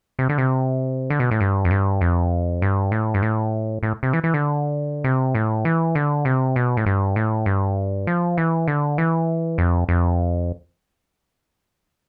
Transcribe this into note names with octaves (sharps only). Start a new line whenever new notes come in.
C3
D3
C3
D3
B2
A2
G2
F2
G2
F2
G2
A2
G2
A2
A2
C3
E3
E3
D3
C3
A2
E3
D3
C3
B2
A2
G2
A2
G2
F3
E3
D3
E3
F2
F2